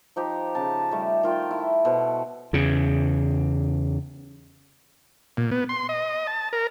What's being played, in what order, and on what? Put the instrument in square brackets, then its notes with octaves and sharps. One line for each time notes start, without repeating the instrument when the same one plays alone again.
[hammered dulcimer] F3 D#4 G4
C#3 A5
G3 A3
D#3 F4 G5
E4
B2 A4 C5
[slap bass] E2 C#3
[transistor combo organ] A#2
B3
C6
D#5
A5
A#4